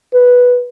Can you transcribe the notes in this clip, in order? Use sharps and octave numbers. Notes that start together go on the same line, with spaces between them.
B4